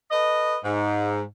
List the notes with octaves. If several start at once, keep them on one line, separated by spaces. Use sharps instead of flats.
A4 B4 D#5
G#2